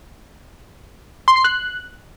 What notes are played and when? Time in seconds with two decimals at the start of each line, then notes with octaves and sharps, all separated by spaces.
1.28 C6
1.36 C7
1.44 F#6